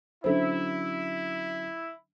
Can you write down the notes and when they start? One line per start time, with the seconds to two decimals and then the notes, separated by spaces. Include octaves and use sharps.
0.24 D3 F#3 C#4 D4 E4 A4 C5